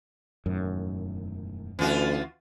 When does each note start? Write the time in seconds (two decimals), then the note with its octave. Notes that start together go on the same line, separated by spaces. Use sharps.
0.46 E1 F#2 A2 D#3
1.79 D2 E3 C#4 F4 F#4